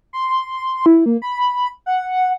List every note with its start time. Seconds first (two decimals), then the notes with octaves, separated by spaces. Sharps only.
0.13 C6
0.86 E4
1.06 A#3
1.22 B5
1.86 F#5